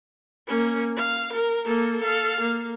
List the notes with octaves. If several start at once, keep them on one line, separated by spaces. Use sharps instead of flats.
A#3 C#4
F5
A#4
A#3 A4
A4 F5
A#3